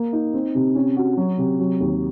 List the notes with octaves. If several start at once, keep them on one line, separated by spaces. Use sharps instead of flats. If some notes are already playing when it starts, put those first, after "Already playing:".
Already playing: A#3
D#4
C4
C3
C#4
F#4
F#3
C3
F#3
D#2